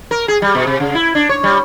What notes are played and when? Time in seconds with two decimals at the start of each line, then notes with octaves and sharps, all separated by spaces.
0.11 A#4
0.28 G#4
0.42 G3
0.55 B2
0.67 C3
0.80 C#3
0.95 E4
1.15 D4
1.29 C#5
1.43 G3